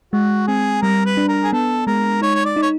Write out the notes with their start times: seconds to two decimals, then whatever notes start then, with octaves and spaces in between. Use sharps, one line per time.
0.13 G#3 F#4
0.47 C4 G#4
0.82 G3 A#4
1.06 B4
1.17 D4
1.28 A#4
1.44 G#4
1.53 B3 A4
1.87 G#3 A#4
2.21 D#4 C#5
2.35 C#5
2.45 D5
2.56 D#4
2.62 C#5